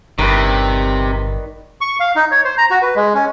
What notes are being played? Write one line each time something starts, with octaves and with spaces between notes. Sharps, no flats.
G1 C3 D#3 B4 D5
C#6
F5
D#4
C#5
C5
A#5
F#4
B4
G#3
C#4